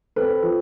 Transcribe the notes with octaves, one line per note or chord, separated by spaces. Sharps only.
C4 A4 B4
F3